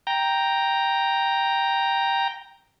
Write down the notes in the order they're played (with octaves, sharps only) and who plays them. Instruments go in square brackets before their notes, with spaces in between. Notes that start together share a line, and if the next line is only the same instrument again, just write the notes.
[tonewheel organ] G5 A#5